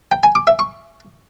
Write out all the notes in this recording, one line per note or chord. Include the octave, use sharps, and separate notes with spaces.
G5
G#5
D6
E5
C#6